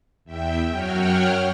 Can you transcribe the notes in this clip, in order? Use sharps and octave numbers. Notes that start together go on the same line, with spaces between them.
E2 E5 G5
F#2 F#3 F#4 C#5 G5 F6